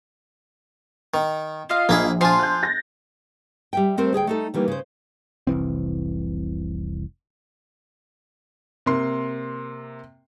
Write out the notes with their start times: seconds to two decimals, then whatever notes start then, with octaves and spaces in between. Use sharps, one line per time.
1.14 D#3
1.69 F4 D#5 F5
1.89 A#1 A#3 E4 G#4
2.21 F3 F4 G#5 A5 C6
2.39 F#6 G6
2.63 A6 A#6
3.73 G3 E5 G5
3.98 A3 C4 A#4 C5
4.13 D2 G#4 E5 G5
4.27 A3 D#4 A4
4.54 D#3 E3 G3 A#3
4.68 C#3 C5
5.47 F1 C2 E3 C4
8.86 C3 A#3 C6